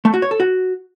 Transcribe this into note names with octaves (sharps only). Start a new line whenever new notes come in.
A3
F#4
C#5
A4
F#4